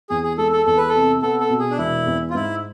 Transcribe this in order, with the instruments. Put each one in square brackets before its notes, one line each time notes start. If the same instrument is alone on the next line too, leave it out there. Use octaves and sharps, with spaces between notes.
[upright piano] E2 [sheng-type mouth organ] G#4
[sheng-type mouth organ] G#4
[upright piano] G#3 [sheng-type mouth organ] A4
[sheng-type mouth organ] A4
[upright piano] E2 [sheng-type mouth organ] A4
[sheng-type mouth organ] B4
A4
[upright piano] C3
[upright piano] B3 [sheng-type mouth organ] A4
[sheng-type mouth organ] A4
[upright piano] B2
[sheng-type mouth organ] G#4
D4
[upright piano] E1 [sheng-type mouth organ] E4
[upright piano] E2
[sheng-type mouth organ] F4
[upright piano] G#2 [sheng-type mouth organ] E4